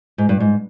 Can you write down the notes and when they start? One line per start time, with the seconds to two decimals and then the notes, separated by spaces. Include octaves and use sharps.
0.18 G#2
0.29 G2
0.40 G#2